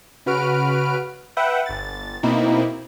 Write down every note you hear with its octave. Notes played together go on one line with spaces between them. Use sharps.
C#3 F#4 B4 F6 D7
B4 E5 F#5 G5
G1 A6
B2 A#3 C4 D#4 E4